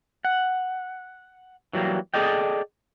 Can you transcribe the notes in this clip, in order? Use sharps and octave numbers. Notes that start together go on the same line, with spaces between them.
F#5
E3 F#3 G3 A#3
G#4 A4 D5 D#5 G5